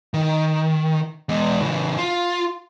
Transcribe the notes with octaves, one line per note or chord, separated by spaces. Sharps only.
D#3
E2 G#3
C#3 E3
F4